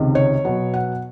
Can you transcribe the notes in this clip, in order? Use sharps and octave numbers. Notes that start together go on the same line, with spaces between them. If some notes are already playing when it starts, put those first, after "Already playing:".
Already playing: C#2 C3 D#3
C#5
B2 F#3 B3
F#5